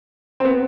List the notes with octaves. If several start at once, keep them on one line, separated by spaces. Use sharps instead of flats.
C4
B3